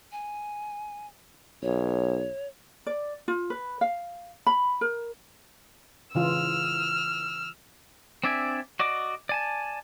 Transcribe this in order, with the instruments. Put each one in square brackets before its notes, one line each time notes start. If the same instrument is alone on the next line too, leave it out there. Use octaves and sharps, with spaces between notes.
[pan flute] G#5
[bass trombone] B1 [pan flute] C#5
[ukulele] D5
F4
B4
F5
B5
A#4
[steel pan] C#3 E3 F4 [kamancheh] E6 F6
[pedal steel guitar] C4 D4 D5 E5 G#5
F#4 D5 D#5 D6
D5 G#5 A5